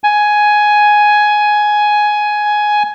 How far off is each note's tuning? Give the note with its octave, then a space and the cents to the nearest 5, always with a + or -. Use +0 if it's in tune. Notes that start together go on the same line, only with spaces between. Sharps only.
G#5 +10